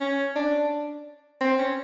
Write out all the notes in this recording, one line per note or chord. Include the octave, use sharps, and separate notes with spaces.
C#4
D4
C4
C#4